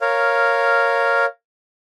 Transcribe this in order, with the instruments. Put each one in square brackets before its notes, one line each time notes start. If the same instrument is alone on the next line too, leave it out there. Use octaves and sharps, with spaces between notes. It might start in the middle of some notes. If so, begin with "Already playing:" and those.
[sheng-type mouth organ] A#4 C#5 F5